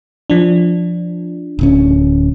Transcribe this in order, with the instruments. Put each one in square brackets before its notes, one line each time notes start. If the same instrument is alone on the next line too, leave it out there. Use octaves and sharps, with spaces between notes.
[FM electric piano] F3 D4
[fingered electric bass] D1 D2 C#4